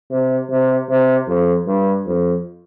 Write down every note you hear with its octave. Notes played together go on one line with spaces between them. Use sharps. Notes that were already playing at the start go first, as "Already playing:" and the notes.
C3
C3
C3
F2
G2
F2